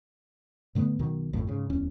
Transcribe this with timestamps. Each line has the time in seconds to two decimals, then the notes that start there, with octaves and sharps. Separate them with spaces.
0.75 A2 D3 A3 B3
0.99 B1 B2 D#3
1.33 G#1 F2 A2
1.47 G#2 C#3
1.70 D1 E2 C#4